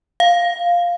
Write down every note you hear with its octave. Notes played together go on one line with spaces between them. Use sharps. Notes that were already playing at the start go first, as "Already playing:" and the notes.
F5